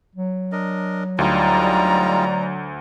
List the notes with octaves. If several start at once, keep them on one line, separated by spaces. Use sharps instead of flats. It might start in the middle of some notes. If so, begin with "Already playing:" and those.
F#3
D4 A#4 D#5
D2 G3 D#4 F4 D5 A#5